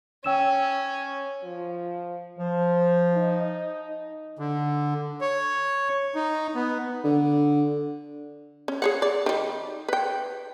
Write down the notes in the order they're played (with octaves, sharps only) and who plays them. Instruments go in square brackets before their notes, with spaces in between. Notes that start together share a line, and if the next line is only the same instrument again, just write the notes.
[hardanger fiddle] C#4 [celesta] G5 E6 E7
[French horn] F3
[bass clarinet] F3 [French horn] C5
[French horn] D#4
[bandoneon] D3
C#5
D#4
B3
[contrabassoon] D3
[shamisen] C#4
G#4 C#5 F#5
D5
D#3 G3
B4 G5